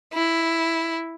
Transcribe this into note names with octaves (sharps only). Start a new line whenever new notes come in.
E4